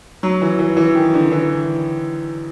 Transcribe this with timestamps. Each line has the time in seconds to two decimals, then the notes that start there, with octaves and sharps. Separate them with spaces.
0.23 F#3
0.42 E3
0.59 E3
0.77 E3
0.95 D#3
1.14 D3
1.32 E3